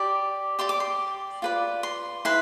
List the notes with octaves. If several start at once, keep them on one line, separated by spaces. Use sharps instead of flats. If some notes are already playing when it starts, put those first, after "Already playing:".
Already playing: G4 D5 B5
G4 D5 C6
D6
C6
F4 B4 D5
C6
E4 B4 C6